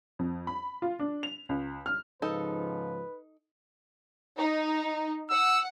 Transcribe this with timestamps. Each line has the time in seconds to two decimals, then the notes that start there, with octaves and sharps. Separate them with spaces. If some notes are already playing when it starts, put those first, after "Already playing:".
0.19 F2
0.47 B5
0.82 F4
0.99 D4
1.23 F7
1.49 C#2
1.86 F6
2.22 G#2 C#3 F3 D#4 A4 B4
4.36 D#4
5.29 F#5 E6